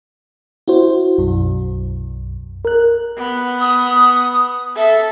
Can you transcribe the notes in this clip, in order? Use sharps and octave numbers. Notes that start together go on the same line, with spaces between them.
E4 F#4 C5
B1 F#2
A#4 F#6
B3
D#6
A4 E5